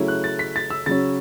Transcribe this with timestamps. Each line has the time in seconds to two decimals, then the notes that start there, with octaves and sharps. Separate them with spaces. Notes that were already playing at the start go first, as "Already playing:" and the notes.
Already playing: C#3 F#3 A3 C#4 E4
0.08 F#6
0.24 A6
0.39 B6
0.56 A6
0.70 E6
0.86 C#3 F#3 C#4 A6